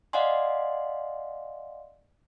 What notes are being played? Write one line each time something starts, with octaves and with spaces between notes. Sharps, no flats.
D5 D#5 F5 F#5 G#5 C6